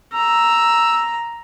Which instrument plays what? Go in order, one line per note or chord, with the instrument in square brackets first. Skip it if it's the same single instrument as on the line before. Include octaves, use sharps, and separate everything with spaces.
[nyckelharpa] A#5 [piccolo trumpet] E6